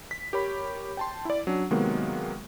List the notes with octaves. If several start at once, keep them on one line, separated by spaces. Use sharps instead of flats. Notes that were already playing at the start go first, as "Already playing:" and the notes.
B6
G4 A#4 C#5 B5
G5 A5 C6
E4 D5
F#3 C#4 D4
C3 D#3 F#3 G#3 A#3 B3